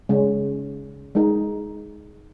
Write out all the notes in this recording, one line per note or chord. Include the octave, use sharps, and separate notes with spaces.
C#3 G#3 C#4
G#3 D#4 A#4